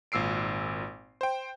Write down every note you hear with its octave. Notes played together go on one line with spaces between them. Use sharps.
G#1 A#2 E6 C7 D7
C5 G5